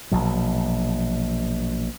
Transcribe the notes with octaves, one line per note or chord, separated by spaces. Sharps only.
A#1 B2 F#3